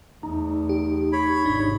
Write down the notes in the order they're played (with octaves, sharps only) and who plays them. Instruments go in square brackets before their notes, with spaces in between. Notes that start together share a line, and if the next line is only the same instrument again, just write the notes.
[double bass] E2 A3 [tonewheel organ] D#4
[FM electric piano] G4
[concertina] C#5 B5
[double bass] G#1 C3 [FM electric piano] D4